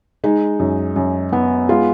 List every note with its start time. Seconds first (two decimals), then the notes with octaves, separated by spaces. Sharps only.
0.24 G#3 D#4
0.59 F#2
0.96 F#2
1.32 B3
1.69 G#3 F4